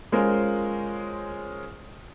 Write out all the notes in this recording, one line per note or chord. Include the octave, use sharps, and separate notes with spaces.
G#3 C#4 F4 A#4 C5